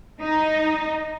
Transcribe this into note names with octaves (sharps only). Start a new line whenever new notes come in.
D#4